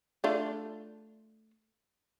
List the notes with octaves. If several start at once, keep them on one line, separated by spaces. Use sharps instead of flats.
A3 D4 F4